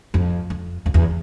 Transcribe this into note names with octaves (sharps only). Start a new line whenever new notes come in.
F2
F2
F2
E2